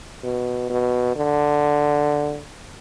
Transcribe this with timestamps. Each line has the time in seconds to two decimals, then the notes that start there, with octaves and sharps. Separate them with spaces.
0.24 B2
0.70 B2
1.16 D3